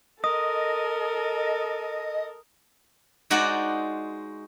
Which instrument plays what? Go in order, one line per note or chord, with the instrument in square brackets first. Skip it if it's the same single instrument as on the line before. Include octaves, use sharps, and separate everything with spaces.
[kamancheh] A4 [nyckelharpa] A#4 [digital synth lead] D#5 [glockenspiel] D#6
[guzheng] G#3 D#4 F#4 C5 D5 F#5